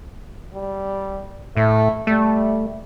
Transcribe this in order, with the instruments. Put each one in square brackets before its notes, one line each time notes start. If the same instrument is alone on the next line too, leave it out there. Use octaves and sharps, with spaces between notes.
[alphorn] G3
[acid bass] A2 [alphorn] A3
[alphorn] G3 [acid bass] A3